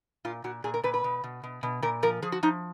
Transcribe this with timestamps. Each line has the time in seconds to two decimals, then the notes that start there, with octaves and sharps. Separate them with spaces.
0.25 A#2 F4
0.44 A#2 F#4
0.64 A#2 G#4
0.74 A#4
0.83 A#2 B4
0.94 B4
1.04 B2
1.24 B2
1.43 B2
1.63 B2
1.82 A#2 A#4
2.03 F3 A#4
2.22 F3 G#4
2.32 F#4
2.43 F3 D#4